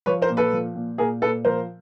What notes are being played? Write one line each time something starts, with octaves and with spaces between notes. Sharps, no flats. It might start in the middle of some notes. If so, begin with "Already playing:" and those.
F3 B4 C#5
A#4 C5
A#2
A4 B4
F3
A#2
A#2 G#4 A#4
A#2 A4 B4
F3 A#4 C5